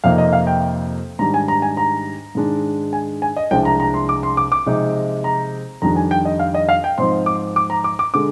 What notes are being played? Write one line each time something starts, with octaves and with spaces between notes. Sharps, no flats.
F2 C3 F3 A#3 D#4 F5
D#5
F5
G5
G#2 D#3 G3 D4 A#5
G#5
A#5
G#5
A#5
G#2 D#3 G#3 D4
G#5
G#5
D#5
C2 C3 F3 G#3 D4 G5
A#5
A#5
C6
D6
C6
D6
D6
C3 F3 G#3 D#4
A#5
F2 D#3 G3 D4 A#5
G#5
G5
D#5
F5
D#5
F5
G5
G#2 F3 C4 D#4 C6
D6
D6
A#5
D6
D6
D3 G#3 D6